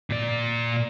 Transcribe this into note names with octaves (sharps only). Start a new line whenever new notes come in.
A#2 D5